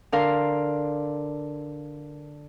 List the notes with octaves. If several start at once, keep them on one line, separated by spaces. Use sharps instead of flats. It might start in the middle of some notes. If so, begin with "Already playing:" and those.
D3 D4 A#4 F5 C6